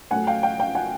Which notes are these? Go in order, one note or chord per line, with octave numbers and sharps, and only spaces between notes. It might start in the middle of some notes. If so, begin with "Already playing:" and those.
A2 F#3 A3 F#5 G#5
F5 G5
F5 G5
F5 G5
F#5 G#5